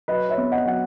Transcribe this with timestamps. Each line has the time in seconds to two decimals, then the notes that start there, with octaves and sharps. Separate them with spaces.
0.08 F#3 B4 D#5
0.29 C#5 E5
0.38 B3
0.52 D#5 F#5
0.66 F#3 F#5